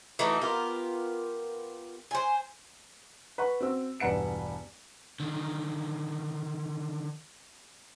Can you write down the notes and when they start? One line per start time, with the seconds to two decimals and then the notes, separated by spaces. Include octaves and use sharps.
0.19 E3 A3 D#4 F#4
0.41 B3 F4 G4 A#4
2.11 C5 G#5
3.38 B4 F#5 C#6
3.61 C4 F#4 E6
4.00 E1 G2 B4 F#5 C#7 E7
5.20 D3 D#3